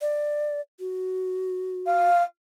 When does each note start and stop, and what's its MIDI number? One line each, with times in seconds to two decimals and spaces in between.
0.01 0.61 74
0.80 2.09 66
1.86 2.23 77